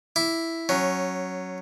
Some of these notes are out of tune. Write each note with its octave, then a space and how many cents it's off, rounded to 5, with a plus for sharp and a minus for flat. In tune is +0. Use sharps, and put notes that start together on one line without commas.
E4 +0 D6 +0
F#3 +0 C#4 -15